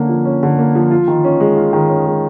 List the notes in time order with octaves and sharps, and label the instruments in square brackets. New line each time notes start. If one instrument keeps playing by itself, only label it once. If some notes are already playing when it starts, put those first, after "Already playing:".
Already playing: [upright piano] D3 A#3 C#4
F3
C#4
D3
A#3
F3
F4
D#3
C#4
G#3
F4
D#3
C#4
G#3